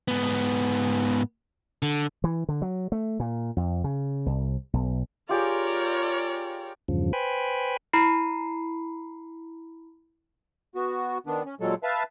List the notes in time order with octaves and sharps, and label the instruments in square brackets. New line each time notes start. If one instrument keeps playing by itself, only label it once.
[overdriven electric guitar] G#2 B3
D3
[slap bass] E3
D3
F#3
A3
A#2
F2
C#3
C2
B1
[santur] F4 G4 G#4 [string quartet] A#4 C#5 D5
[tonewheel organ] E2 G2 C#3 F3
B4 C5 G5 G#5 B5
[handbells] E4 A#5 B5 C7
[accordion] B3 F#4
D#3 B3 D4
C#4
A#2 F#3 G#3 A4
B4 E5 F5 A5